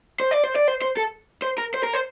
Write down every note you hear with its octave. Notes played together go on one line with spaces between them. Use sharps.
C5
D5
C5
D5
C5
C5
A4
C5
A#4
C5
A#4
C5